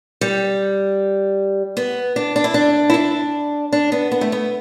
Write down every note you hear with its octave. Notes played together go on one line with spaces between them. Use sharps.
G3
B3
D4
D4
E4
D4
E4
D4
D4
B3
B3
A3
B3